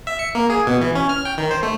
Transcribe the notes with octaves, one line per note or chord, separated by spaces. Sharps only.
E5
C#7
A#3
G#4
B2
E3
C#4
F6
G5
D#3
C5
A3